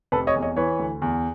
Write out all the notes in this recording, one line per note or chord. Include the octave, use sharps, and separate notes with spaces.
F1 A4 B4
C#5 D#5
E2
C#5 D#5
E3 B4 C#5
D2
E2